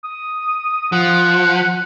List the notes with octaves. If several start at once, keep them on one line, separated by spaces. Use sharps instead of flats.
D#6
F3 F#5